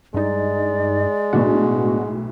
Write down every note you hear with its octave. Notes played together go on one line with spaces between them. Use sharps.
G2 G#3 D#4 D5
B1 A2 B3 D4 F#4